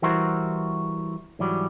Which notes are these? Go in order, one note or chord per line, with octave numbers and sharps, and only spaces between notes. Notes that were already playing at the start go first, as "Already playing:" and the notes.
E3 G3 E4 F#4 A#4 C5
G#2 E3 F#3 G3